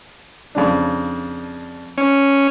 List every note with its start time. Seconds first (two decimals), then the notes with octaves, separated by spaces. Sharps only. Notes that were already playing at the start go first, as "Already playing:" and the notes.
0.55 F2 C#3 D4
1.98 C#4